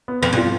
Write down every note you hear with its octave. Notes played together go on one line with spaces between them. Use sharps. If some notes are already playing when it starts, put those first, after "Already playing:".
B3
F2 B3
G2
F4